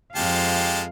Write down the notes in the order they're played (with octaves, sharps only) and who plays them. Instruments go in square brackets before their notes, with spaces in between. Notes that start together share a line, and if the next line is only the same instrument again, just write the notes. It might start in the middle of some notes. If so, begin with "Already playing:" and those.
[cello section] F2 F5 [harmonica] G#3 G4 A5